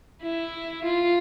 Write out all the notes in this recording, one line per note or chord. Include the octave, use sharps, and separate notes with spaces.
E4
F4